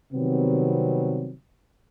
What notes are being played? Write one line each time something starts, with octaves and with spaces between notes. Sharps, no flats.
C3 D#3 F#3 G3 B3 C4